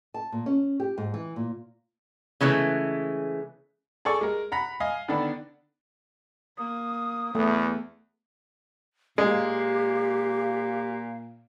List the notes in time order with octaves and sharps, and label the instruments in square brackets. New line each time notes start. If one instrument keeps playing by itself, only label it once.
[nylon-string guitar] A5
A#2
C#4
G4
G#2
E3
A#2
[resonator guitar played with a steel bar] C#3 E3 G#3 A3
[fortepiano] G#4 A4 D5 C#6
G#3 A#4
F#5 A#5 B5
D#5 F5 G#5
D3 D#3 B3 D4
[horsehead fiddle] A#3 [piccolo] D#6
[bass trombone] E2 [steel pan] A3 [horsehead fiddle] B3
[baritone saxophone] A#2 [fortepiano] G#3 [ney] G4 [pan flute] F5